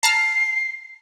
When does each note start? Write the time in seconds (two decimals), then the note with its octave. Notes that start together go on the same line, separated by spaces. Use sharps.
0.03 A5 A#5 F6 C7